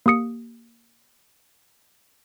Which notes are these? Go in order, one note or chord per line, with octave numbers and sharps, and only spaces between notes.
A#3 G4 D#6 C#7